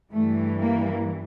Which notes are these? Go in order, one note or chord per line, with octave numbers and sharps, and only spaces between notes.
G2 E3 G3 A3
A#3